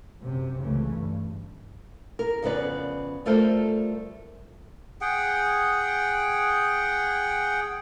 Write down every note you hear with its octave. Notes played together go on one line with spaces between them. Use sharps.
F#2 C3
C#2 C#3 E3 A3
G2
A#4
F2 C#3 B3 B4 D5
G3 A3 F4 A4 A#4 C5
G#4 F#5 G5